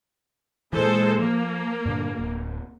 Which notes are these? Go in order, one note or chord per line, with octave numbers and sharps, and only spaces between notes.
A#2 E3 G#3 A4 C5
F3 A#3
G2 A#2 D3
D1